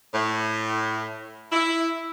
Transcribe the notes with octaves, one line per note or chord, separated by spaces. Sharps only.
A2
E4